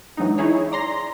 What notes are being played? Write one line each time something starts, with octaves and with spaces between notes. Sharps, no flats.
E3 F#3 G#3 D4 D#4
D#4 E4 G#4 C#5
D5 A#5 C6 A#6